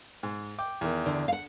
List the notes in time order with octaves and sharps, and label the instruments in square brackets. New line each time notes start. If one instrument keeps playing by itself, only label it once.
[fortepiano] G#2
G5 D6
E2 D#3
[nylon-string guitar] D3
F5 F#5